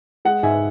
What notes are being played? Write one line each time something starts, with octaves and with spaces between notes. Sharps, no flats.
G#3 F#5
G#2 E5 G#5